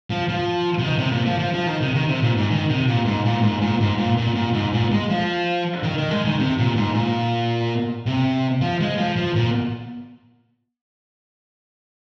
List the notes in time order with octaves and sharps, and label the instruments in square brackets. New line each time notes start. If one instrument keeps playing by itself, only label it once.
[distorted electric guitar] F3
F3
C3
D#3
C3
A#2
F3
F3
F3
D#3
C3
D#3
C3
A#2
G#2
D#3
C3
A#2
G#2
A#2
G#2
A#2
G#2
A#2
A#2
A#2
G#2
A#2
G#3
F3
D#3
D#3
G#3
D#3
C3
A#2
G#2
A#2
C3
F3
G#3
F3
F3
A#2